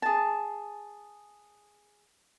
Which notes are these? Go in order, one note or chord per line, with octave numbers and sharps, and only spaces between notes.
G#4 A5